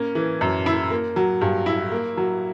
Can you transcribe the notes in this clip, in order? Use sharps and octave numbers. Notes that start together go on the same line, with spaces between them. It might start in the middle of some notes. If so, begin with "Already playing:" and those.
Already playing: A#3 C#4
E3
F#2
E4
A#3
F#3
G2
E4
A#3
F#3